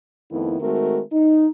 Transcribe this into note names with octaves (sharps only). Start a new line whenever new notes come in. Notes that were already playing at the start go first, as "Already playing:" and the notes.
F2 D#3 A3 B3 E4
D#3 G#3 A3 C4 F#4 A#4
D#4